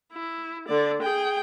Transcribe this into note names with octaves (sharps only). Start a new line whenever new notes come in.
E4
D3 D5
G#4 G5